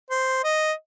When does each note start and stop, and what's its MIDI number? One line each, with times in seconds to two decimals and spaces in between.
0.10 0.40 72
0.44 0.72 75